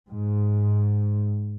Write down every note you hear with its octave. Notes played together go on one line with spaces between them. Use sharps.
G#2